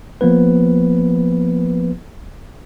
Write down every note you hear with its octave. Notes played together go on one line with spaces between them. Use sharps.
F3 A#3 B3 B4